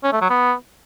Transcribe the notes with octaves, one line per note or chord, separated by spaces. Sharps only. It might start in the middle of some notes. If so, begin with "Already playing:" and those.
C#4
A3
F#3
B3